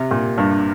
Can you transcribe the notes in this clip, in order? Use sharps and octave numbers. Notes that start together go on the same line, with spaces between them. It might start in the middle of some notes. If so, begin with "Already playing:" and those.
Already playing: C3
A#2
G2